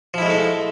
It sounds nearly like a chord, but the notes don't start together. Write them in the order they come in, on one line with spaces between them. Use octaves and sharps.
F3 E4 G#3 A3 D#4